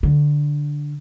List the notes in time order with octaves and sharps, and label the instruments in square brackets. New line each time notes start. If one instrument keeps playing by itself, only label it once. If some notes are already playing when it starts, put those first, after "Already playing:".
[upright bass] D3